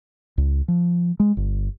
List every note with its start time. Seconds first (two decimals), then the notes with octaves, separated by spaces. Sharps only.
0.38 C#2
0.68 F3
1.20 G#3
1.37 G1